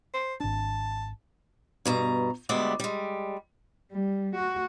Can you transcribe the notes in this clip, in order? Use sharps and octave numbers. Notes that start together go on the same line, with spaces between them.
C5
G#1 D4 A5
G2 B2 A#5
D2 G3 G#3 B3 D5 E5
G3 G#3
G3
F#4